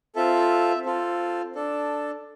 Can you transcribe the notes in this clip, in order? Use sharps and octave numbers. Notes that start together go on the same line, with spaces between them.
C4 F4 A4 E5
C4 F4 A4
D4 A4